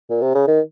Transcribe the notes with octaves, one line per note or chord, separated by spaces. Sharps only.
A#2
C3
C#3
D#3